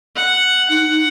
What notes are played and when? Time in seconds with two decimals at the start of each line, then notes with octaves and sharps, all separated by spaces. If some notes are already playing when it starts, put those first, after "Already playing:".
0.16 F#5
0.70 D#4 F#5